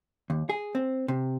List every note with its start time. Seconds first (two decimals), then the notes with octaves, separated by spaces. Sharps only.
0.30 D#2
0.50 G#4
0.75 C4
1.08 C3